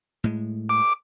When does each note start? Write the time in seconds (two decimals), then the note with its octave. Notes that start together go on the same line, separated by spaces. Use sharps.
0.24 A2 G#3
0.69 D6